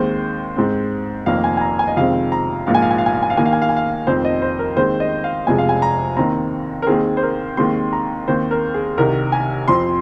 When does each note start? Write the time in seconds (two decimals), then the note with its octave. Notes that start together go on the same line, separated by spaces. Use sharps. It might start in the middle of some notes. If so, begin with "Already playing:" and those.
Already playing: D#2 D#3 G#3 C4 C5
0.56 G#2 G#3 C4
1.26 F1 F2 D#3 A#3 F5
1.44 G#5
1.57 G#5
1.61 A#5
1.79 G#5
1.88 D#5
1.97 F2 C3 D#3 G#3 C4 F5
2.32 A#5
2.67 A#1 G#2 F3 A#3 F5
2.74 G#5
2.82 F5
2.91 G#5
2.98 F5
3.06 G#5
3.14 F5
3.22 G#5
3.30 F5
3.37 D#2 D#3 A#3 G#5
3.45 F5
3.53 G#5
3.62 F5
3.69 G#5
3.77 F5
4.07 F1 F2 D#3 C4 C5
4.25 D#5
4.42 C5
4.59 A#4
4.77 D#2 D#3 G#3 C4 C5
5.00 D#5
5.24 F5
5.47 F1 F2 C3 F3 G#3 G#5
5.58 F5
5.69 G#5
5.82 A#5
6.17 D#2 D#3 C4 A#5
6.82 A#4
6.87 D#2 D#3 C4 G#4
7.17 C5
7.23 A#4
7.57 D#2 D#3 G#3 C4 C6
7.93 A#5
8.28 D#2 D#3 C4 C5
8.51 A#4
8.74 G#4
8.97 C2 C3 D#3 A#4
9.32 G#5
9.68 F2 F3 C4 C6